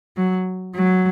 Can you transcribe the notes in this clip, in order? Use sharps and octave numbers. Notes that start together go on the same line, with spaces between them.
F#3
F#3